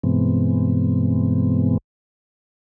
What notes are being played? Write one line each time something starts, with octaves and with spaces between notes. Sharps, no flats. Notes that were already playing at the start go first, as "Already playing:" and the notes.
G2 B2 E3 G#3 B3 C4